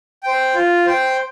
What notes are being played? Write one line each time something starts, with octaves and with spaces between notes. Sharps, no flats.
C5 G5
F4
C5 G5